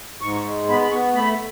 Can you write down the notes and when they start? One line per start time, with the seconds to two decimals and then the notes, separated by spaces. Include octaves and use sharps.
0.21 G#2 C#6
0.45 G#3
0.68 B3 B5
0.82 B5
0.92 B3 C#6
1.14 A3 B5